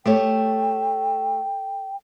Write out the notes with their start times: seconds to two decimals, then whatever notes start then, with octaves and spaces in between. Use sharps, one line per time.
0.06 A3 G4 A4 C#5 G5